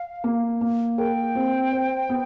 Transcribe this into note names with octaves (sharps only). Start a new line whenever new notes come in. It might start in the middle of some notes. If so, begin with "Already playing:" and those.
Already playing: F5
A#3
A#3
A#4 G5
C4
C5
B3